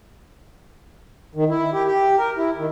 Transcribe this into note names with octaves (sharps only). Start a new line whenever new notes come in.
D#3
E4
G4
G4
A#4
E4
D#3